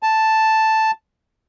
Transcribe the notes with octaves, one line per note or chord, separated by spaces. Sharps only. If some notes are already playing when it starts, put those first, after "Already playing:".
A5